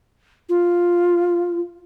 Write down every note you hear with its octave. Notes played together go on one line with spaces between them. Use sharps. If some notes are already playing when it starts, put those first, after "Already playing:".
F4